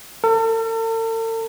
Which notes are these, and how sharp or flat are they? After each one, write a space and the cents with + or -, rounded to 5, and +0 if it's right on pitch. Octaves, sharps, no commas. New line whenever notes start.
A4 +45